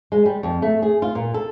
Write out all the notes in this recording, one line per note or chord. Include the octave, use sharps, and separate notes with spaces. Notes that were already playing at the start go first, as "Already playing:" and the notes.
G#3
G3
F2
A3
G#4
F4
A#2
A4